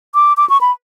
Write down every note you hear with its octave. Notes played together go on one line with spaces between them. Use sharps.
D6
D6
C#6
B5